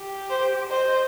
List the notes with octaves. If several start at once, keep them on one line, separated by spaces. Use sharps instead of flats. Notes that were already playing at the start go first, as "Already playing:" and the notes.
Already playing: G4
C5
C5 D#5